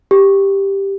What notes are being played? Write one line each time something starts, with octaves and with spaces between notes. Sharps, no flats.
G4